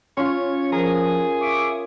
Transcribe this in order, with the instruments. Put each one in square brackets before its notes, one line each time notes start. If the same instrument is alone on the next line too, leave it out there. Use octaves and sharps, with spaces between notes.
[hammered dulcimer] C#4 F4 [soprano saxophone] C#5 [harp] C6 F6
[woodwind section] F3 [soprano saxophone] G#4 [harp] A#4 A#5
[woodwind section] E5 C#6 D6